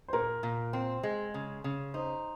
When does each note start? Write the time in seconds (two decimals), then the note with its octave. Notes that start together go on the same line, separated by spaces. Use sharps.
0.08 C5
0.13 A#2 A#4
0.43 A#2
0.73 C4 C5
1.03 G#3
1.34 C#3
1.64 C#3
1.94 D#4 C5